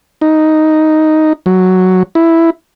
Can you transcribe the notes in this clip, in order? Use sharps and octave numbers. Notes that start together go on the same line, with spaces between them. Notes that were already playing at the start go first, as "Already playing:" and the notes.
D#4
F#3
E4